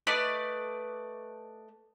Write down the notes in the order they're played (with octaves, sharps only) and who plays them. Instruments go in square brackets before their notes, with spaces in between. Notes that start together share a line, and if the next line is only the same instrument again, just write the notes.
[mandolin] A3 B4 D5 D#5